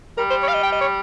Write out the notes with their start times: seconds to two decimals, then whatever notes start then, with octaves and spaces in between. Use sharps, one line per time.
0.18 G3 A#4
0.30 C5
0.43 C#5
0.48 F5
0.54 D#5
0.63 G5
0.72 D#5
0.81 C#5